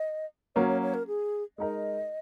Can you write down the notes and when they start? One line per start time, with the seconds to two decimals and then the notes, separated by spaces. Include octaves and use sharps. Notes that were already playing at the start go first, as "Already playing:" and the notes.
Already playing: D#5
0.56 F#3 A#3 C#4 C#5
0.68 C#5
0.82 C#5
0.94 A#4
1.07 G#4
1.58 G#3 D#4 A#4 D#5